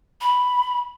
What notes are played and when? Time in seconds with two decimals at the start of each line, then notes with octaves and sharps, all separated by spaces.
0.21 B5